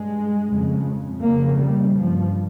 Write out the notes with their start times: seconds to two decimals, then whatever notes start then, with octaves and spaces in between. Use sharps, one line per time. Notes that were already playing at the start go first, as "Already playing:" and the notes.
Already playing: G2 G#3
0.49 F2 C#3
1.22 F2 C#3 A#3
1.59 G3
1.96 G2 F3